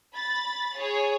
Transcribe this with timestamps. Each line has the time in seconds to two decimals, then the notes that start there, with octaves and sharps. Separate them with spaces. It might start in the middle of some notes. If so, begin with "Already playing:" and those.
0.15 B5 A6
0.76 G#4 C#5